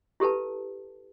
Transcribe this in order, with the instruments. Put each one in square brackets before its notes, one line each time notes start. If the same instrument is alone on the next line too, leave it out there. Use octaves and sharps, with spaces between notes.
[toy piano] E4 G4 A4 B4 A5